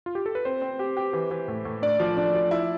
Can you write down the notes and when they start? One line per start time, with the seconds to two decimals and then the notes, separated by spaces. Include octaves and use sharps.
0.06 F4
0.15 G4
0.26 A4
0.35 B4
0.45 C4 C5
0.62 C4
0.79 G4
0.97 G4
1.13 E3
1.31 E3
1.48 A2
1.65 A2
1.82 D4 D5
2.00 F3
2.17 D4
2.34 F3
2.51 E4